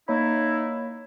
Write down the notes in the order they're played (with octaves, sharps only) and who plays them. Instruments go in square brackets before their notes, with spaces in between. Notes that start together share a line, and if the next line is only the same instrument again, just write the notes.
[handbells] A#3 C#5 B5 [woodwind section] D#4 E4